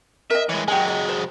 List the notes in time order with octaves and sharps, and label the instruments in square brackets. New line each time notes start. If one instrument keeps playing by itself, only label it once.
[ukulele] A#4 D#5 [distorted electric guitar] E5
[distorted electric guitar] E3 G#3 [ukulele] C#5
[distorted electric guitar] F#3 G#3 [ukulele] G4 G#4 G#5
[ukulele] D#5
C5